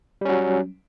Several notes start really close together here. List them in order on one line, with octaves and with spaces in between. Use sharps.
G3 C#4 F#3